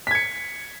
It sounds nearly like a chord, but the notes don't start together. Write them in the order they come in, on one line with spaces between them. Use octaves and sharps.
B6 G#6 C#7